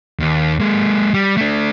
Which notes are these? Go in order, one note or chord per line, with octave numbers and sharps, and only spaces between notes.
D#2
G#3 A#3
G3
A3 D4